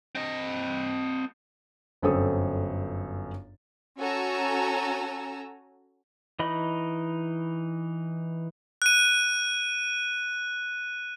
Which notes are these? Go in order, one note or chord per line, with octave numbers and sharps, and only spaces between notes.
C4 D#5
G1 F#2 C4 A4 D#6
C#4 F#4 A4 G#5 A#5 E6
E3 D#4 D#5 B5
F#6 D#7